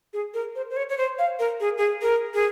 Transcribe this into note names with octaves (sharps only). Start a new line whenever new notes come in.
G#4
A#4
C5
C5
C#5
C#5
C5
F5
A#4
G#4
G#4
A#4
G#4